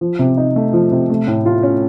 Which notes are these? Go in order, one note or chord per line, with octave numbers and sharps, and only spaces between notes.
F3
C3
D#4
A3
F3
C3
A3
A2
F4
C#4